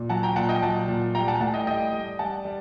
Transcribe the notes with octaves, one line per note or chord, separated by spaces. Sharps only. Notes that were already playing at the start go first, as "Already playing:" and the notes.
Already playing: A#2
F#3 F#5 A5
G5 A#5
A#2 F#5 A5
D#5 G5
F#3 F#5 A5
A#2
G3 G5 A#5
F#5 A5
A2 F#5 A5
D#5 G5
G3 D#5 G5
G3
G3 F#5 A5
G3